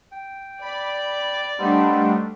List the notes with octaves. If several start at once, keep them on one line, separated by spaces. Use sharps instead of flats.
G5
D5 B5
G3 A3 B3 C4 D4 D#4